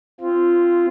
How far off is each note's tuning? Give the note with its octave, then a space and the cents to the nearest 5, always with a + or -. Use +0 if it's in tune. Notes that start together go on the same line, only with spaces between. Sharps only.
C4 +0 F4 -10